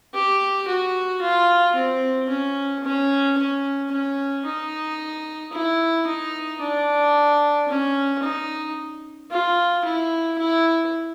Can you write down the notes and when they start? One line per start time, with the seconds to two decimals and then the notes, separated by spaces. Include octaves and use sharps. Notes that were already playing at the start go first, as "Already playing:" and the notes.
0.14 G4
0.68 F#4
1.22 F4
1.76 C4
2.29 C#4
2.84 C#4
3.38 C#4
3.92 C#4
4.45 D#4
5.53 E4
6.07 D#4
6.61 D4
7.68 C#4
8.23 D#4
9.31 F4
9.85 E4
10.38 E4